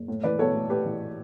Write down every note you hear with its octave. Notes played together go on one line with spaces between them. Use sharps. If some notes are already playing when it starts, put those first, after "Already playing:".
Already playing: F#1
A2
E3 B4 D5
B1 A4 C#5
A3
A2 G4 B4
E3